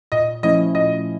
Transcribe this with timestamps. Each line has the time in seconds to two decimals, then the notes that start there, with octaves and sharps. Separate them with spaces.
0.12 A#2 D#5
0.43 F3 A3 C#4 E4 D#5
0.75 A#2 D#5